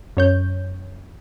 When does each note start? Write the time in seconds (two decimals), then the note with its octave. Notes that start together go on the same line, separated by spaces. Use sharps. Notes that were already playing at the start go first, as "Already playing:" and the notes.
0.17 F#2 C#5 G6